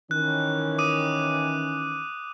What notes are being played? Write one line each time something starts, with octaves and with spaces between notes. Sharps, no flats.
D#3 E3 C#4 F#6
D6 D#6 D#7